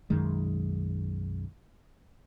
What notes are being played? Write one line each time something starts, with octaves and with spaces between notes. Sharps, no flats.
B1 F#2 D#3 G#3